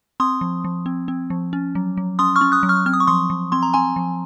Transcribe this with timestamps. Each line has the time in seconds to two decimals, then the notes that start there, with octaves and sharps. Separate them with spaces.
0.20 C4 C6 D#6
0.41 F3
0.64 F3
0.86 C4
1.08 C4
1.30 F3
1.53 C#4
1.75 F#3
1.97 F#3
2.19 C#4 C6 D#6
2.36 C#6 F6
2.41 C#4
2.52 D#6 F#6
2.63 F#3
2.69 C#6 F6
2.86 C4 F6
2.93 D#6
3.00 C#6
3.07 F3 C6 D#6
3.30 F3
3.52 C4 C6
3.63 A#5
3.73 C4 G#5 C6
3.96 F3